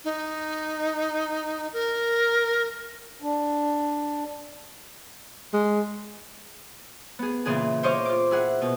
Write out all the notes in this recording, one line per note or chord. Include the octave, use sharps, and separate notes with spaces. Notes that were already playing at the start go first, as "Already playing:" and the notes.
D#4
A#4
D4
G#3
B3 G#4
A#2 C#3 E3 G#4
C5 C#5 D#5 F5 D6
F4 D6
E4 G#4 F#5
B2